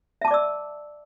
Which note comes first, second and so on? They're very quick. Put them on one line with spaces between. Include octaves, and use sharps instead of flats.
E5 A5 D6 D5 E6